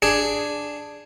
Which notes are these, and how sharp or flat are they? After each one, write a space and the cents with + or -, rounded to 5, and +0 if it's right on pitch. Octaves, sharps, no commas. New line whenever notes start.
D4 +0 G#4 +0